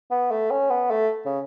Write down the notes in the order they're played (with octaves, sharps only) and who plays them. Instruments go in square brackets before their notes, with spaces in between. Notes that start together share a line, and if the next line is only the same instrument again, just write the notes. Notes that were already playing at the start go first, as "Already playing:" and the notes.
[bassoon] B3
A3
C#4
B3
A3
C#3